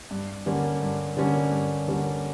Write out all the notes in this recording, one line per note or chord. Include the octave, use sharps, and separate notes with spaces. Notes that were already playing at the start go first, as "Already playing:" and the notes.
G2
D3 G3 A#3 C#4
G2
D3 G3 A#3 C#4
G2
D3 G3 A#3 C#4